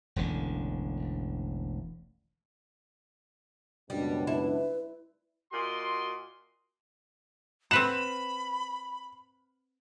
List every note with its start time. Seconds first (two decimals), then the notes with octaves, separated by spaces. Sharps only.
0.16 E1 A1 D3
3.90 C#2 F#2 B2 G3 D4
4.27 E4 B4
5.52 A#2 F#4 D#5 C6
7.71 C4 B4 F#5 B5 E7